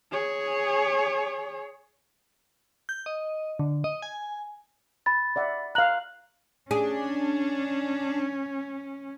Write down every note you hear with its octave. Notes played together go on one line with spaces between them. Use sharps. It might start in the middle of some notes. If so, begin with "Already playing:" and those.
G#4 C#5
G6
D#5
D3
D#5
G#5
B5 A6
D5 E5 F#5
F5 A#5 F#6 F#7
C#4 D4 G#4